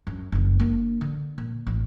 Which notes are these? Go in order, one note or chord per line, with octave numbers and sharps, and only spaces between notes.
F#2
F#1 F2
A#3 D4
D3
A#2
A1